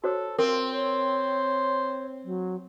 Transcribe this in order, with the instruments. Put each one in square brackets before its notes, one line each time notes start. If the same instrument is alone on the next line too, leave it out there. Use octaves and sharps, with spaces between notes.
[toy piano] F#4 C5 C#5 [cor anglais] A4
[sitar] C4 [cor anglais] F4 [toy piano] A#4
[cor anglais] C5 [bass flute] C#5
[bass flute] F#3